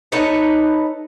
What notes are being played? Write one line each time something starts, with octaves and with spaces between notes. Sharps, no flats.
D#4 A4 B4 C#5